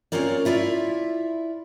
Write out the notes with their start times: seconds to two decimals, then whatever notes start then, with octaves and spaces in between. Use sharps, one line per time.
0.12 A#3 C4 C#4 F4 A#4 D5
0.45 E4 F4 D5 E5